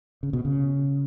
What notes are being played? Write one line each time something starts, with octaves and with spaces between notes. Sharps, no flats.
C#3
B2
C#3